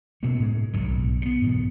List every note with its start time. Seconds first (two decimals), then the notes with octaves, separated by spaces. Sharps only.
0.23 B2 A#3 B3 C#4
0.40 A2 G#3
0.73 G1 C2 G#2 F#3
0.88 B1
1.22 C3 B3
1.42 G#2 B2 E3